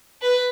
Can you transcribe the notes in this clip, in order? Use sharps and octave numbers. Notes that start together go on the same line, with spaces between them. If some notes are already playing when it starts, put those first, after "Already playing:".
B4